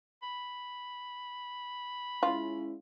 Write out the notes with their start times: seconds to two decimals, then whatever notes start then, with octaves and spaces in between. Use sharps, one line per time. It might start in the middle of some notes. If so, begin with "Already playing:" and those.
0.23 B5
2.23 G#3 C#4 E4 F4